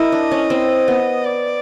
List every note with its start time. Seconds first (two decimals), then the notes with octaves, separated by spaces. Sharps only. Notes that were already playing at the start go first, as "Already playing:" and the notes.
Already playing: E4 A#4 D#5
0.12 D4
0.31 C#4
0.50 C4
0.88 B3
1.25 D5